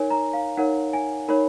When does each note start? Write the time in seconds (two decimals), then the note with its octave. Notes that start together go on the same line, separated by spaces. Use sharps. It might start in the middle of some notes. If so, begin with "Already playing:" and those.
Already playing: D#4 A#4 C#5 G#5
0.11 A#5
0.33 F5
0.57 D#4 A#4 C#5 F#5
0.93 G#5
1.28 D#4 A#4 C#5 B5